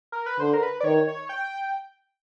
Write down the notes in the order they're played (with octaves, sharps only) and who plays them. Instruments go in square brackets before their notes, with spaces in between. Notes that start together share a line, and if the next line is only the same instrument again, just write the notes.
[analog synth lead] A#4
B4
[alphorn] D3 [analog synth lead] C5
[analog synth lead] A#4
B4
D5
[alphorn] D#3 [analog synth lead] C#5
[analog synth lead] C#5
G5